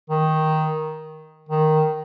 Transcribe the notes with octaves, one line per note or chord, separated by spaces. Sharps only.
D#3
D#3